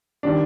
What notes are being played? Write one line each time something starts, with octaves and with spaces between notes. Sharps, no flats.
D#3 G3 D4